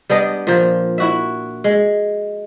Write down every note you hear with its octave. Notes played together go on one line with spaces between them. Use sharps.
G3 B3 D4 D#5
A#2 F3
E4 F#4 E5
G#3